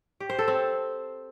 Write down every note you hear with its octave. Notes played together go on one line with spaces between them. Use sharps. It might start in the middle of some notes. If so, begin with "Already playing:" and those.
G4
C5
A4
C4